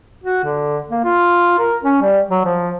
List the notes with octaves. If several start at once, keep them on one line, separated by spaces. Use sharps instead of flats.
F#4
D3
A#3
F4
A#4
C#4
G3
F#3
F3